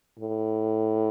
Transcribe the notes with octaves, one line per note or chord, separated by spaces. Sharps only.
A2